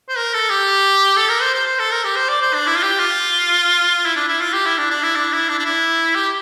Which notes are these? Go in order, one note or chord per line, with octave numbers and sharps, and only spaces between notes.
C5
A#4
A4
G4
A4
A#4
C5
C5
C5
A4
A#4
G4
C5
D5
C5
D4
E4
F4
G4
F4
E4
D4
E4
F4
G4
E4
D4
D4
E4
D4
E4
D4
D4
E4
G4